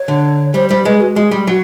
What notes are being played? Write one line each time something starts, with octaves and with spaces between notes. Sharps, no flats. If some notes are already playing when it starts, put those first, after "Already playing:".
Already playing: C#5
D3
G3 C5
G3 C5
G#3 B4
F#4
G#3 G#4
G3
F#3 F#4